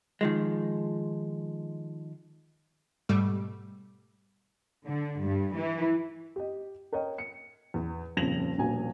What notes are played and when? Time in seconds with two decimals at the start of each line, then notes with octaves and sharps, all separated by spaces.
0.21 D#3 F3 G#3
3.09 G#2 B2 G3 A3
4.86 D3
5.19 G2
5.56 E3
6.36 G4 D#5
6.92 A#4 C#5 D#5 G5
7.18 C#7
7.74 E2
8.17 D#1 F2 C#3 A#6 F7 F#7
8.58 D#1 A#1 B2 G#5